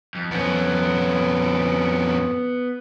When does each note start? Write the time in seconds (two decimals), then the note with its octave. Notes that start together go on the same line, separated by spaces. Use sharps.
0.15 F2
0.31 F2 B3 C#4